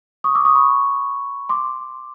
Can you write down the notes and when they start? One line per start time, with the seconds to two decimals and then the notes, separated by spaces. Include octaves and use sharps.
0.24 C#6 D#6
0.35 D6 E6
0.45 C#6 D#6
0.55 B5 C#6
1.49 C6 D6